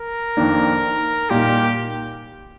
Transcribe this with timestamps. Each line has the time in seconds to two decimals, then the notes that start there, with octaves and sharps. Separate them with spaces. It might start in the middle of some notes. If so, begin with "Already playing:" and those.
Already playing: A#4
0.37 F2 D#3 A#3 D4
1.30 A#2 G3 A#3 D#4 G4